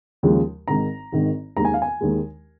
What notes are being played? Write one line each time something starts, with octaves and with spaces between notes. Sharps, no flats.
D#2 C#3 F3 G#3
G#1 G#2 D#3 A#5
G#1 G#2 D#3
D#2 D#3 G#3 A#5
G#5
F5
G#5
D#2 D#3 G#3